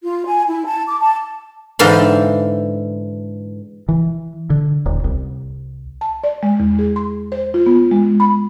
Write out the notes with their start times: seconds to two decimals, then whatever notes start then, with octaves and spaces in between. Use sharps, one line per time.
0.03 F4
0.26 G#5
0.48 E4
0.65 A5
0.87 D6
1.00 A5
1.79 G#2 D3 E3 F5 G5 B5
3.89 E3
4.50 D3
4.86 D#1
5.04 C2
6.01 A5
6.24 D5
6.43 G#3
6.60 E2
6.79 G#4
6.96 C6
7.32 C5
7.54 F4
7.66 B3
7.91 G#3
8.20 B5